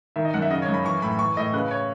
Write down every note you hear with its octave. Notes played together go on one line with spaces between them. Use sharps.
D#3 E5
D#5
F#2 F#5
E5
C#3 D#5
C#5
F#2
B5
E3 C#6
A2 B5
E3 C#6
A2 D#5
C#3 B4
C#5